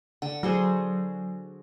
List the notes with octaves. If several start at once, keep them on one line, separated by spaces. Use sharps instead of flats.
D3 F#5
F#3 F#4 G#4 C5